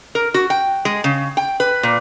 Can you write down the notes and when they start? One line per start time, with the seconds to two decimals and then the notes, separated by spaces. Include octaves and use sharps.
0.15 A#4
0.34 F#4
0.50 G5
0.85 G#3
1.04 C#3
1.37 G5
1.60 B4
1.83 A#2